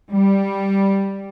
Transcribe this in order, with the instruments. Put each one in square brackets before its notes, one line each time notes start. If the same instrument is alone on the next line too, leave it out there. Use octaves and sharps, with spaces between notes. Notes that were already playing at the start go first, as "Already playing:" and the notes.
[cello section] G3